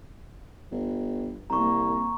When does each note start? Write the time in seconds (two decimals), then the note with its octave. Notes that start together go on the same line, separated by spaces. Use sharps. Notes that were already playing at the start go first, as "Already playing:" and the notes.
0.71 G1
1.50 C2 A#3 A#5 C#6